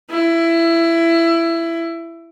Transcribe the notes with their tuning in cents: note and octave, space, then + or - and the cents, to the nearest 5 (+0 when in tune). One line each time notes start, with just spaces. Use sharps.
E4 +20